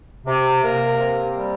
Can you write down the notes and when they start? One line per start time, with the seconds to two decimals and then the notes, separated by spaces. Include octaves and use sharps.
0.26 C3
0.63 A#3 A#4
0.99 C3
1.37 G3